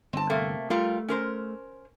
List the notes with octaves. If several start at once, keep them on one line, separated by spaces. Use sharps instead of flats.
G1 C4 A5
C3 A3 A#3
G3 A3 F4 A#4
C#4 A#4 C5